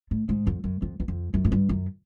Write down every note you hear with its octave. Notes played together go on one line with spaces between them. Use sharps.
A2
G#2
F2
F#2
F2
E2
F2
F#2
G#2
G2
F#2